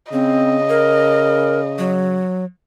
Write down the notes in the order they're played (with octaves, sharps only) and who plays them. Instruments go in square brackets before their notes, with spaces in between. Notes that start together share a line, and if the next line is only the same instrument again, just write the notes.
[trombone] C#3 [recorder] C4 [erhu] D#5
[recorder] A#4
F#3